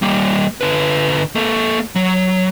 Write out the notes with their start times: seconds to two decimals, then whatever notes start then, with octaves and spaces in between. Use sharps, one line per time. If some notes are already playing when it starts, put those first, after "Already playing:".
0.02 G3 A#3
0.61 D3 B4
1.35 A#3 A4
1.96 F#3